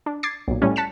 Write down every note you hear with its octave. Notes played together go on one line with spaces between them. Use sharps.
D4
D6 G#6 A6 C7
B1 A#2
A2 G3 C#4
A5 F#6 B6 C#7 E7